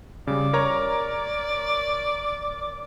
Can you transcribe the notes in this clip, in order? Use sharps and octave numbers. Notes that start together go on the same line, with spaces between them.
C#3 G3 D5
A#4 C#5 A#5